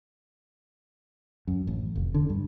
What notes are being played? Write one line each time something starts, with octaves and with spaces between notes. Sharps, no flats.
F#2
A1
F1
D3
G2